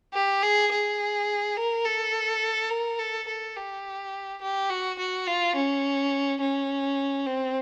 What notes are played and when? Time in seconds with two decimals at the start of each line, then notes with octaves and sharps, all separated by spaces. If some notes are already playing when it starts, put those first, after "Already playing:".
0.14 G4
0.43 G#4
0.71 G#4
1.57 A#4
1.85 A4
2.70 A#4
2.99 A4
3.28 A4
3.56 G4
4.41 G4
4.69 F#4
4.99 F#4
5.27 F4
5.56 C#4
6.41 C#4
7.26 C4